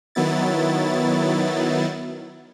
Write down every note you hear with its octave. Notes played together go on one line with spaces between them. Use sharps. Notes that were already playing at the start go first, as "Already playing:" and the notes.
D#3 F#3 B3 E4 A6